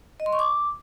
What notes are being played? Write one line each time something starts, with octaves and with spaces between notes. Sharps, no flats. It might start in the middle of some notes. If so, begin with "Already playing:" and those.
D#5
C6
C#6
D6